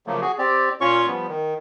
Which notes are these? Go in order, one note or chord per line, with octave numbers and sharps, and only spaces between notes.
C#3 F3 F#3 A3 A#3
F#4 G#4
C4 G4 D5
A#2 C#4 F4 C#5 C#6
F3 G3 B3
D#3